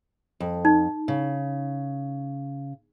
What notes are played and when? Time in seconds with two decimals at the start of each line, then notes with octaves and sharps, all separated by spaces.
0.40 F2
0.65 D#4
1.08 C#3